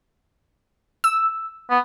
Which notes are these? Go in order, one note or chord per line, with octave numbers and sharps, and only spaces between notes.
E6
B3